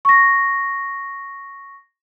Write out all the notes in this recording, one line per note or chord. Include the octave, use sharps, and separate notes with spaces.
C#6 A#6